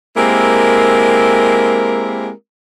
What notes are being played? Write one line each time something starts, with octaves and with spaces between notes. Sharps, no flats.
G#3 A#3 C4 E4 G4 A#4